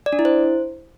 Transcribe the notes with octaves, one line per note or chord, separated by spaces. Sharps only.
D5
D4
E4
C5